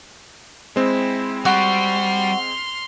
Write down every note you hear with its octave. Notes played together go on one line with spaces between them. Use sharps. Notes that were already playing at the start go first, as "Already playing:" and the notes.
G#3 C4 E4
G3 F#4 C6 F6